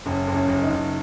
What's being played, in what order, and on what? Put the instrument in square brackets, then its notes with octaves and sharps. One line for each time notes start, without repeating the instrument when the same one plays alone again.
[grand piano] F#1 [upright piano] C#4
[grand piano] F#1
[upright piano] C#4
[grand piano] F#1
[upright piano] D#4
[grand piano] F#1